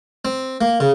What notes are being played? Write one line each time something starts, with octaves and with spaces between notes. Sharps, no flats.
C4
A#3
C#3